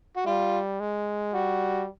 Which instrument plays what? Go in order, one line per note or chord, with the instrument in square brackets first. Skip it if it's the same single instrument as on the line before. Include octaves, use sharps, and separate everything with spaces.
[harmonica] F#4
[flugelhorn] G3 [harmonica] F4
[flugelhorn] G#3
[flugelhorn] G3 [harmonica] F#4